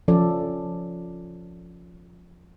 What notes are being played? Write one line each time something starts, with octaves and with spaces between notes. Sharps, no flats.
F3 C#4 A4 D5